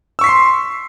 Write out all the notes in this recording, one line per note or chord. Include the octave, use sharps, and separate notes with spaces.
C6 C#6 E6 B6 C7